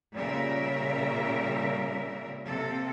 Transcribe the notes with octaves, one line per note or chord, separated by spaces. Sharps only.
A#2 C#3 G3 A#4 E5
C3 A#3 A4